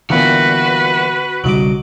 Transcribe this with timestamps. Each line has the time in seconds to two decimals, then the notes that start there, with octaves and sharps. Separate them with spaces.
0.10 E2 G2 A#2 D3 B3 F#4 B4
1.44 B1 C#3 F#3 G3 D#5 D6